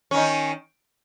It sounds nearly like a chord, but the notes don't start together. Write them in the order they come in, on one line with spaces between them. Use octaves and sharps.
C#4 D#3 D#4